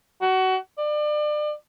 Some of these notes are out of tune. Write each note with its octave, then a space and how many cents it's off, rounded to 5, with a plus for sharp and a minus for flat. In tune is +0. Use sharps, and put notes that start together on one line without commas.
F#4 +25
D5 +35